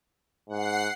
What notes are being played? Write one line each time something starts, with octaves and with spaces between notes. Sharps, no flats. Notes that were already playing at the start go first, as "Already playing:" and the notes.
G#2 F#5 C7